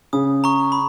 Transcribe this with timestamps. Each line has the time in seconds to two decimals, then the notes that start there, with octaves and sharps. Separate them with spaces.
0.13 C#3 D#6
0.44 A#5 C#6
0.72 B5